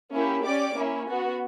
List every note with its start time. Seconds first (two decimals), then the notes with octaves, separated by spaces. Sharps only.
0.13 A#3 C#4 E4 G4
0.44 C#4 G4 D5 D6
0.76 A#3 C#4 E4
1.08 B3 F#4